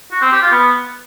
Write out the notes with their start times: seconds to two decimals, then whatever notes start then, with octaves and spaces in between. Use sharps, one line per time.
0.12 F#4
0.22 C4
0.32 G4
0.42 F4
0.52 B3